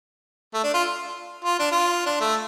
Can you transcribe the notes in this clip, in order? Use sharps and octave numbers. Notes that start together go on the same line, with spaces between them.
A3
D4
F4
F4
D4
F4
D4
A3